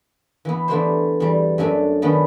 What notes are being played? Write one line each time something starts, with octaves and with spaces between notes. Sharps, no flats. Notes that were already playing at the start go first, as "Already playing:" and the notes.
E3 B3
E3 A3 B3 D4 G4 C5
E2 G3
F#2 F#3 A3 D4 G#5
D#3 A3 B3 C#4 D4 D5